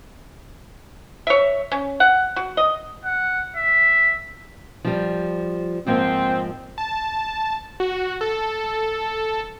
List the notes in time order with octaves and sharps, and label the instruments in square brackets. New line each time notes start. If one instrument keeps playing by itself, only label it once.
[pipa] C#5 E5
C#4
F#5
F#4
D#5
[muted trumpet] F#5
E5
[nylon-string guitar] F3 G3
[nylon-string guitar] G#2 F3 A#3 [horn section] C4
[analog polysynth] A5
F#4
A4